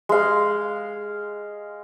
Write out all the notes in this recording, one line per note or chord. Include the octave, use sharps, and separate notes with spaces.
G#3 F5